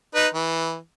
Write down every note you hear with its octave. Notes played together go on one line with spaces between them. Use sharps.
D#4 B4
E3